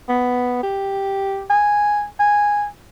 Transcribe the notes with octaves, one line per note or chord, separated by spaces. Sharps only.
B3
G4
G#5
G#5